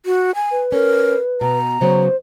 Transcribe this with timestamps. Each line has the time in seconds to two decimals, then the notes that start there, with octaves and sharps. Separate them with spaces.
0.06 F#4
0.35 G#5
0.51 B4
0.72 C#4 A#4
1.41 B2 A#5
1.81 C#3 F#3 B3 C5